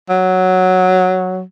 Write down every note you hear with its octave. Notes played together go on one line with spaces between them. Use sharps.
F#3